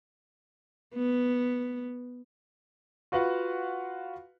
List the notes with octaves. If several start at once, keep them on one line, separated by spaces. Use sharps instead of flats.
B3
F4 F#4 B4 F5 F#5